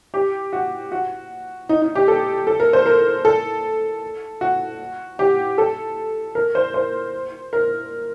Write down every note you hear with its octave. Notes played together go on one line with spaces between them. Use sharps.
G4
F#4
F#4
D#4
D#4
G4
A4
A4
A#4
C5
A#4
A4
F#4
G4
A4
A#4
C5
C5
A#4